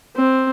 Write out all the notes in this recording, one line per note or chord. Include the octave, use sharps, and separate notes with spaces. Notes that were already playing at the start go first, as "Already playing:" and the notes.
C4